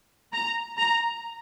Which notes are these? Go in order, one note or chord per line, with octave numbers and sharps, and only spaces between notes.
A#5
A#5